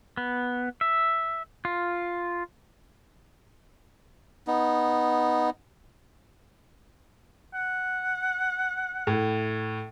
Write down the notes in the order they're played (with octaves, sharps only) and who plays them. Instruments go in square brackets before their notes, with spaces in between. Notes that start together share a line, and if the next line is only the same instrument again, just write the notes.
[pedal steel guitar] B3
E5
F4
[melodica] B3 D#4
[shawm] F#5
[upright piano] A2